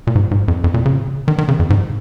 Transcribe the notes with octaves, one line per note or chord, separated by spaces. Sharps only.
A#2
G#2
G#2
F2
F2
A#2
C#3
D#3
D#3
C#3
F2
G#2